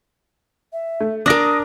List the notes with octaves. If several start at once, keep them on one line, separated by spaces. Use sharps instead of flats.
E5
A3
D4 A#4 D6 D#6 A#6 D7